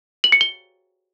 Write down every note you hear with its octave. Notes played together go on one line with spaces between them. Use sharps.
F#7
C#7
G7